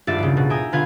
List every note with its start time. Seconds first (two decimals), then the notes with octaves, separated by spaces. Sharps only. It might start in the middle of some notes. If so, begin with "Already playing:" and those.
0.07 G#1 G2 F4 D5 E5 A6
0.19 D#2 C#3
0.37 B2
0.50 E5 G5 G#5 A#5 D#6
0.72 B2 D3 F4 B4 F5 G#6